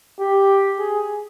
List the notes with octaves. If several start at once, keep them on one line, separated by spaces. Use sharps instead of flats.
G4
G#4